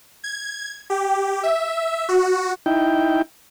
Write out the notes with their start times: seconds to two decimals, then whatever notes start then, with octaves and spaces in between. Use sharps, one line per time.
0.24 G#6
0.90 G4
1.43 E5
2.09 F#4
2.66 D#4 E4 G5